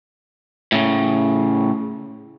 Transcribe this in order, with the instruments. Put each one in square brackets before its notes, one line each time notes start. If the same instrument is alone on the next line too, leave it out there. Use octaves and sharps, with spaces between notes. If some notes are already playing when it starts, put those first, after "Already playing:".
[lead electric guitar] A2 C#3